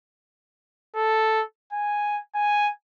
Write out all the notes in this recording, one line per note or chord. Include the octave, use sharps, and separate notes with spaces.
A4
G#5
G#5